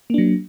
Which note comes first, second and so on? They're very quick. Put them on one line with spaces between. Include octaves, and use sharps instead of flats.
A#3 D4 F#3